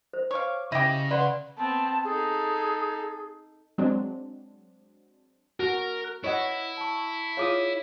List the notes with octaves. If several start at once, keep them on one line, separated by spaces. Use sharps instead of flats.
C5
C#5 F5 C#6 D6
C#3 E4 G4 D#5
B4 D5 F#5 C6
B3 C4 A5
D#4 G#4 A4
F#3 G#3 C4 D4
F#4 A#4
F#6
E4 C#5 D#5 F#5
A5 C#6
F4 G#4 C#5 F5 D6 D#6